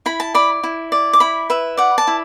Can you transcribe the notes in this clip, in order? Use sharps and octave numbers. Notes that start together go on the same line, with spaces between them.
E4 B5
A5
D5 B5
E4
D5
D6
E4 B5
B4 E5
D5 F#5
A5
E4